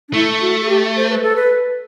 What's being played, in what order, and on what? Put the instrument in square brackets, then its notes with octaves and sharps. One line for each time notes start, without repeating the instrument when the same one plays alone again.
[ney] D4
[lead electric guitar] A3 [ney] E4
[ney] F#4
A4
G4
C5
B4
A4
B4